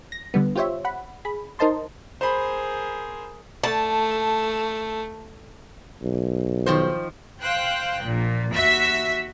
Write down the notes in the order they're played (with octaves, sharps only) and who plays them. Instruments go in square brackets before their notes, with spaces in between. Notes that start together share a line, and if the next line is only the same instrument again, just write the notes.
[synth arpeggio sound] A#6
D3 G3 B3
F4 G4 C5 C#5 E5
F#5 B5
G#4 B5
D#4 A#4 C5 D#5 A5 C6
[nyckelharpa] G#4 A#4 [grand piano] C5 B5
[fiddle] A3 [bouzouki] A5
[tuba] B1
[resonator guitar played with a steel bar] D#3 F3 C5
[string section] C5 F5 G5 F#6
A#1 A#2
D#2 F#4 E5 E6 B6